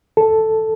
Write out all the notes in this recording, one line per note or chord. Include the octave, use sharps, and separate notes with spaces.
A4